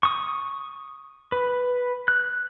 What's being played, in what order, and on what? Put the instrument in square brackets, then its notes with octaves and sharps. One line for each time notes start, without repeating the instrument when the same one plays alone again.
[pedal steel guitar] C#6 D#6
B4
F#6